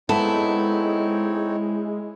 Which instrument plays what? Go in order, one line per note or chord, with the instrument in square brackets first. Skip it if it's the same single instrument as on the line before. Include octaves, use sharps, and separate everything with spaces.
[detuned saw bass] G#3 [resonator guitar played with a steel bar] B3 A4 [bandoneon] C4 D#4 C#5 [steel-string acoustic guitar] E4